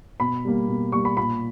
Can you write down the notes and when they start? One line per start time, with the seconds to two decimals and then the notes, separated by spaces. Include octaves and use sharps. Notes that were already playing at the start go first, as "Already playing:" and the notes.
0.20 B2 B5
0.45 G3 A#3
0.68 B2
0.92 G3 A#3 C#6
1.05 B5
1.17 A#2 B5